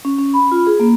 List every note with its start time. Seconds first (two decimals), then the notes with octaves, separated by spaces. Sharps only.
0.05 C#4
0.19 C#4
0.34 B5
0.52 F4
0.67 G#4
0.80 A#3